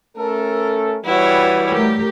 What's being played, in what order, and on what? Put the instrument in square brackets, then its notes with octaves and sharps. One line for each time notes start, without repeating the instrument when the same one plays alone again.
[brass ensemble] A3 C#4 A4 [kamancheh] A#4
[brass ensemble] E3 G3 [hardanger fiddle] E4 C#5 [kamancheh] F#4 B4
[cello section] A3 G4 A#4